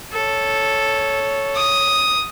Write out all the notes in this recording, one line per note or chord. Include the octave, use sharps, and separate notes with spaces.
A4 C#5
D#6